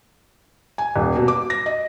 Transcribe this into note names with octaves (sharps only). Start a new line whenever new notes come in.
G#5
D#1
B2
D6
A#6
D#5